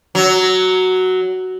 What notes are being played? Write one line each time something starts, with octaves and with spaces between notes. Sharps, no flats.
F#3